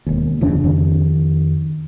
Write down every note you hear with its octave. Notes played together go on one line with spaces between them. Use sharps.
E1 D#2
D#1 F2 C#3 D4
F2 D#3